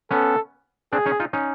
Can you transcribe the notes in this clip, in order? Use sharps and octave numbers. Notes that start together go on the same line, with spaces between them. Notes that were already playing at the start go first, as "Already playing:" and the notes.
B3 C#4 A4
C4 D4 G#4
C#4 D#4
D#4 F4
C#4 D#4